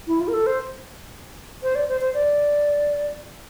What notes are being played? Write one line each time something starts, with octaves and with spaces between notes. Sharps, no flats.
E4
F4
A#4
A4
C5
C5
D5
C5
C5
D5